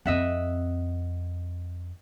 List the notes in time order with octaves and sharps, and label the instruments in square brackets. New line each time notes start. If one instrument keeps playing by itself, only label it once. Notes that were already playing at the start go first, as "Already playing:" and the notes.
[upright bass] F2 C4 [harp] D#5 E5 F#5